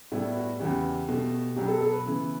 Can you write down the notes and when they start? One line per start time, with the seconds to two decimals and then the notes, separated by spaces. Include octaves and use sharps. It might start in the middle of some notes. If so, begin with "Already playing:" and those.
0.12 A2 G3 B3 E4
0.36 F#4
0.60 E2 C#3 E3 B3 G4
1.09 B2 A3
1.57 B2 F#3 B3 G4
1.68 A4
1.81 A4
1.93 B4
2.05 C#3 E3 B3